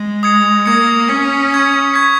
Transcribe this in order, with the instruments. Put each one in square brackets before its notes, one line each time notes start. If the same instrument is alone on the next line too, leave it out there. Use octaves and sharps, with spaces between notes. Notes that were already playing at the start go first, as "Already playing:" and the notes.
Already playing: [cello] G#3
[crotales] D#6 G#6 C#7
[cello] A#3 [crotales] D#6 G#6 C#7
[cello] C#4 [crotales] C#6 G#6 C#7
[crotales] C#6 G#6 C#7
C#6 G#6 B6